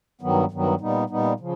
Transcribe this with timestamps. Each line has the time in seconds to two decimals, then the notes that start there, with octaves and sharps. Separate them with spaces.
0.21 G2 D#3 F#3 B3
0.51 G2 D#3 F#3 B3
0.80 A#2 G3 B3 D#4
1.10 A#2 G3 B3 D#4
1.40 C#3 F3